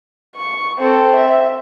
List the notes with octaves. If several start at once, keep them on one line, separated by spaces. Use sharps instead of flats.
C#6
C4 A4
E5